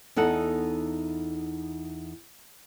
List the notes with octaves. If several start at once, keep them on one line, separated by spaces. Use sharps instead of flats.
E2 D#4 A4 F#5